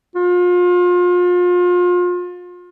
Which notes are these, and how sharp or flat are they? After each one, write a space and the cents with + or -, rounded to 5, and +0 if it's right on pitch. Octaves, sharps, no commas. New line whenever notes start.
F4 +35